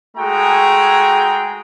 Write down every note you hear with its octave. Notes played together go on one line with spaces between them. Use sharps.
G#3 A3 F#4 G#4 G5 A#5